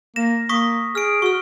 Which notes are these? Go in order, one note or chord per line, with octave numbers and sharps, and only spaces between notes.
A#3 A#6 E7
A#3 C#6 D#6 B6
G#4 F6 D7
F#4 C#6 F6